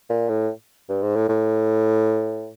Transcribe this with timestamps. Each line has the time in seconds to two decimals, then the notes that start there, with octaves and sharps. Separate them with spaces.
0.10 A#2
0.29 A2
0.89 G2
1.02 G#2
1.16 A2
1.29 A2